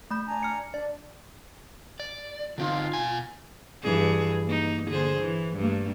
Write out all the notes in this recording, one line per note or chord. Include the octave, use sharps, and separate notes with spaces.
A3 B5 G6
D4 G#5 A#5
F6 C#7
D4 D5
D5
D3 C4 D#4 F4
B2 G#5
G2 E3 G#4
A#3 D#4
D3 G#4 C5
E3
G2 A3 A#3